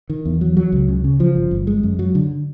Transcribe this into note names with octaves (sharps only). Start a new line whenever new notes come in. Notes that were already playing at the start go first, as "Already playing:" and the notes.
D#3
E2
F#3
F#3
C#2
C#3
C#3
F3
G1
G1
G#3
F#2
F#3
D3